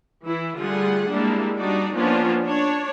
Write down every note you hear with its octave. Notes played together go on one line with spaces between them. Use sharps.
E3 E4
D3 G3 A3 F4 G#4 F#5
G3 G#3 A#3 D4 E4
G3 D4 D#4 F#4 D5
F3 A#3 B3 C#4 D4 F4
D4 C#5